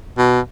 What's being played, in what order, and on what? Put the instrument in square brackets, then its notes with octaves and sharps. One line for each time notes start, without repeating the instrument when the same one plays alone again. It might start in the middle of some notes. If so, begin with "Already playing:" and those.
[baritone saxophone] B2